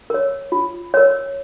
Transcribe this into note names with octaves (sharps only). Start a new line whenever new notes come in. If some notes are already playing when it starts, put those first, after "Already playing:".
A#4 C#5
F4
A#4 C#5